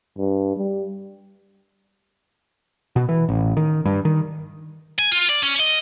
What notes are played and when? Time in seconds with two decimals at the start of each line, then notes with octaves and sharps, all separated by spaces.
0.18 G2
0.56 G3
2.96 B2
3.09 E3
3.29 A1
3.57 D#3
3.85 G2
4.05 D#3
4.99 G#5
5.12 F4
5.29 D5
5.43 C#4
5.60 D#5